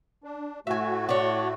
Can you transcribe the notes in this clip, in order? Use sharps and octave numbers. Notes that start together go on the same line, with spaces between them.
D4
A2 A3 F#4 E5 G#5
D4 C#5